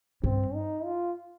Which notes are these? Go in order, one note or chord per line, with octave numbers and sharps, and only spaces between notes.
G2 C4
D#4
F4